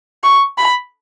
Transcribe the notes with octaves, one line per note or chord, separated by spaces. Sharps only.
C#6
B5